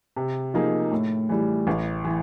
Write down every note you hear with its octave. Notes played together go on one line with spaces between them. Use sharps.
C3
F3 A#3 D#4 G#4
A2
E3 G3
A1
E3